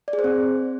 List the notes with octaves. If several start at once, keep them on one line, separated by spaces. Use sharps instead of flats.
D5
G#4
C5
C4